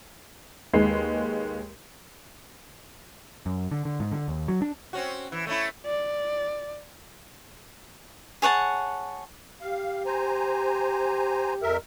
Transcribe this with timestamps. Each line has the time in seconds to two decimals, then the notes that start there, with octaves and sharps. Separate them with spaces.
0.73 D#2 G#3 D#4 B4 C7
3.46 F#2
3.71 D3
3.85 D3
4.00 G#2
4.12 D3
4.28 D#2
4.48 F#3
4.62 D4
4.93 C4 C#4 F#4
5.32 E3
5.47 A3 C#4 E4
5.86 D5
8.42 G#4 C#5 F#5 A5
9.61 G4 F5
10.06 C5 G#5 A#5
11.62 F2 A#4 E5